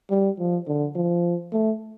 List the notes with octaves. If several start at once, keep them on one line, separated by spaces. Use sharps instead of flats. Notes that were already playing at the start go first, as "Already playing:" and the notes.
G3
F3
D3
F3
A3